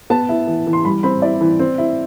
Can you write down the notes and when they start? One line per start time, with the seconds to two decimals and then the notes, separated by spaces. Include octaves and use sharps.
0.10 B3 A5
0.29 E4
0.47 E3
0.67 E3
0.73 C6
0.85 G3 B5
1.03 C4 B5
1.22 E4 D5
1.41 E3
1.59 C4
1.78 E4